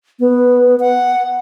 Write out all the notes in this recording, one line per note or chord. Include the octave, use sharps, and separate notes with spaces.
B3
F#5